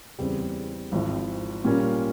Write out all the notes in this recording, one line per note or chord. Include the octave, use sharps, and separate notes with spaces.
E2 C#3 G3 C4
G#1 G#2 F3 C4 E4
A#2 G3 C#4 F4 A#4